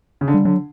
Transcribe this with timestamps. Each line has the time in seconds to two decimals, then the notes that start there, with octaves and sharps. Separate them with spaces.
0.21 C#3
0.28 D3
0.34 G3
0.45 D3 F#3